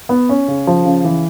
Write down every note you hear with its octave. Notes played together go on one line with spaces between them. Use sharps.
B3
C#4
C#3
F3
C#3
E3